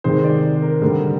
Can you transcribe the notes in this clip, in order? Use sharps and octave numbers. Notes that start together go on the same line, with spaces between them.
C3 D#3 G#3 C5
D5
A#4
D3 G3